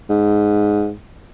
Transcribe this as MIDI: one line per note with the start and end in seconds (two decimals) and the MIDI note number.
0.10 0.93 44